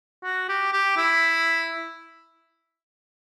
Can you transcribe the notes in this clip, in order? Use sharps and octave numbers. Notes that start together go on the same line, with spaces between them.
F#4
G4
G4
E4